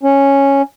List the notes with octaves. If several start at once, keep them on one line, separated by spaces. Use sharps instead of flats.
C#4